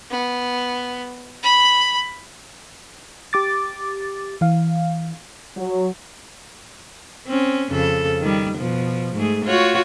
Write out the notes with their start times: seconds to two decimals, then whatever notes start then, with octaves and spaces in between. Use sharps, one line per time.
0.10 B3
1.43 B5
3.33 G4 D6 A6
4.41 E3 F5
5.56 F#3
7.27 C4 C#4
7.70 F2 C#3 A4
8.21 D#3 G3
8.57 B2 F3
9.15 G#2 A3 G#4
9.45 F4 F#4 C#5